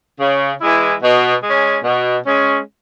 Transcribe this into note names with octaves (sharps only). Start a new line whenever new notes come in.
C#3
E3 G#3 E4
B2
G#3 C#4
B2
G#3 C#4